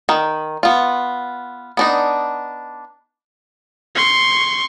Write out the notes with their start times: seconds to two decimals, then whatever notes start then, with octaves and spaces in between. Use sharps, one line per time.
0.09 D#3
0.63 B3 F4
1.77 B3 D4 D#4
3.95 C6 C#6